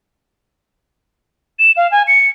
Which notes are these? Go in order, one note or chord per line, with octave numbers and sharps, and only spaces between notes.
E7
F5
G#5
C#7